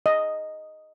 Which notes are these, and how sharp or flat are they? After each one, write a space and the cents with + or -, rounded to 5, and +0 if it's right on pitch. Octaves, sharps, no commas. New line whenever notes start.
D#5 +0